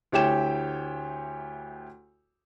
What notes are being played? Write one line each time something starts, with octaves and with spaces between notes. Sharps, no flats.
D2 E4 G4 C#5 G5 E7